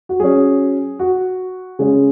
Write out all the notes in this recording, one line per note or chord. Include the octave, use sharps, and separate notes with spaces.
F#4
F#3 C#4 G#4
F#4
C#3 G#3 C#4 G#4